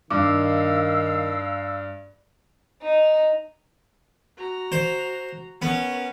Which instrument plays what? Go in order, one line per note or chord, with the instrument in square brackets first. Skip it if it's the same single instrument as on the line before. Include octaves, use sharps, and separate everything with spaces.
[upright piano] G2 [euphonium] D#3 [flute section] F5 E6 [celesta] D6
[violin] D#4
[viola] F#4 A#5
[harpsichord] C5
[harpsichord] B3 [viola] C#4 A#4